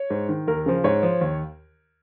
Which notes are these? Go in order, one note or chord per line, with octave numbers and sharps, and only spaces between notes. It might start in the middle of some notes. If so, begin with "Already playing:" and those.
Already playing: C#5
G#2
D#3
D#2 A#4
C#3 F3
G#2 C#5
F3
D#2